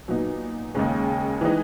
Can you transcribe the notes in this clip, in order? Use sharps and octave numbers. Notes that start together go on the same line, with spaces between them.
A#2 F#3 B3 D#4
D#2 C#3 G#3
E3 G#3 D#4